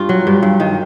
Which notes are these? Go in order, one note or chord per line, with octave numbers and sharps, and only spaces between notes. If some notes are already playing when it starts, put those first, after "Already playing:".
Already playing: G2 F4
F#3
G2
G2
D#3